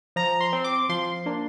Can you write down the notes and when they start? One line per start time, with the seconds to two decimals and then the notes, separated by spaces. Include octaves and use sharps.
0.16 F3 A#5
0.41 C6
0.53 C4
0.64 D6
0.89 F3 C6
1.26 A#3 D4